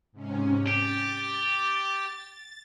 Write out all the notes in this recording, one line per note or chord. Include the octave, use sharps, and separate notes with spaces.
G#2 C3 C#4
G4 A6